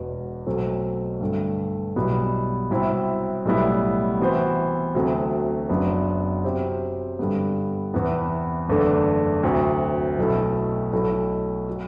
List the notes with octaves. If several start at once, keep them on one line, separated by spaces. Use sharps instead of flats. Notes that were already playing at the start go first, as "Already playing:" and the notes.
Already playing: E1 E2 B2
B1 B2 F#3 A3 C4
G2 D3 A3
B1 B2 G3 B3 E4
C2 C3 F#3 C4 E4
B1 A2 G3 B3 E4
C3 E3 B3 F#4 C5
D2 C3 F#3 A3
F#1 F#2 F#3 B3 D4
C3 F#3 C4 G4
G2 D3 G3 B3
E2 C3 E3 B3 E4
F#1 E2 D3 A3 D4
D2 C3 F#3
B1 B2 A3 E4
B1 B2 A3 E4
F#3